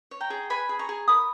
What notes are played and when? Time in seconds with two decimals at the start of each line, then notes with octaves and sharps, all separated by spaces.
0.11 C#5
0.20 G5 A#5
0.30 G#4
0.50 B4 G#5 B5
0.69 G#4
0.79 A#5 C#6
0.89 G#4
1.08 A#4 B5 D#6